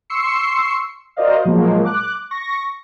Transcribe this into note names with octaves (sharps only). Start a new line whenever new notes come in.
C6 C#6 E6 C7 C#7
F#4 A#4 C5 D5 D#5 F5
A#2 F3 F#3 G#3 A#3
D6 F#6
C#6 A#6